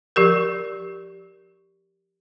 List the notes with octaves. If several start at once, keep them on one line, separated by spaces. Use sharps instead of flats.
F3 G4 A#4